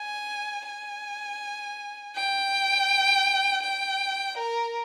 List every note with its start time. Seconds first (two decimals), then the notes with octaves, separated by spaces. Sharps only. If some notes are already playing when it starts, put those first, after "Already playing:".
Already playing: G#5
0.67 G#5
2.16 G5
3.63 G5
4.38 A#4